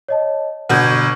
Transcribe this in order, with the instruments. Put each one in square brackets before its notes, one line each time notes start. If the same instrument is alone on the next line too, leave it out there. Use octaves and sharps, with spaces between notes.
[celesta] C#5 D#5 A5
[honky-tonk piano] G1 B2 [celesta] F#5 G6 G#6